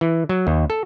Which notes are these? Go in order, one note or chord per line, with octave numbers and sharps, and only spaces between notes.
E3
F#3
D#2
A4